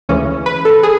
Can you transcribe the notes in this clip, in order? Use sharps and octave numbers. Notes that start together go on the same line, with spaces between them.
D2 C#3 E3 G#3 C#4
B4
A4
G#4